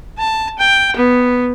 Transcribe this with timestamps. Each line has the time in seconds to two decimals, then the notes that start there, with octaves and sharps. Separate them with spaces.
0.18 A5
0.58 G5
0.96 B3